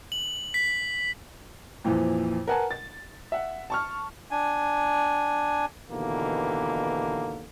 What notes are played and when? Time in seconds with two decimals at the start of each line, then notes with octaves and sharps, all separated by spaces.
0.12 F#7
0.54 B6
1.84 F2 A#2 E3 F3
2.47 A#4 B4 F#5 G#5 A5
2.71 A6
3.32 E5 F#5
3.70 A5 C#6 F6
4.31 D4 G#5
5.91 D#2 B2 D3 E3 A#3